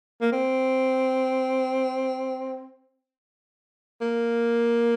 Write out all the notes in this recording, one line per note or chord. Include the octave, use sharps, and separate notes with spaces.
A#3
C4
A#3